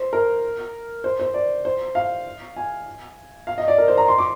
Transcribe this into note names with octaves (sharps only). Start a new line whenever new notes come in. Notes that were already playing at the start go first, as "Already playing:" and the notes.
Already playing: C5
A#4
C5
C5
D5
C5
F5
G#5
F5
D#5
D5
A#4
C5
A#5
C6
D6